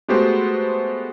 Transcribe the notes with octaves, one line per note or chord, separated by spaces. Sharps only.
G#3 A3 B3 F#4 G4 C5